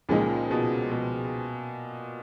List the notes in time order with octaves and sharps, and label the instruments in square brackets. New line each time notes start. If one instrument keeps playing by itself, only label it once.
[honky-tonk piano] C#2 C#3 F3 G#3 D#4 [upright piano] A#2
[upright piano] B2
B2